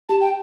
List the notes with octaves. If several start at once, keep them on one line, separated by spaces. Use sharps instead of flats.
G4 A5
G5